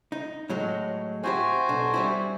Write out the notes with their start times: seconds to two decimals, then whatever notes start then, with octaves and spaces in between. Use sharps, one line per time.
0.12 D#4
0.49 A2 F#3 G#3
1.24 C4 E4 F#4 G4 C5 G#5
1.69 B1 D4
1.94 G3 C4 E4